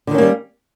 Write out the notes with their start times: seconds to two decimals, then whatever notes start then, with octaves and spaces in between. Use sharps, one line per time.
0.07 D3
0.11 D#3
0.14 C#4
0.18 A#3
0.22 G3